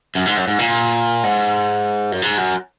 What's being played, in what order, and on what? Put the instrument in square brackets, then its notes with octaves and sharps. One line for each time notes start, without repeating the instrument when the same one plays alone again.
[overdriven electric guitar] F#2
G#2
F#2
G#2
A#2
G#2
F#2
G#2
F#2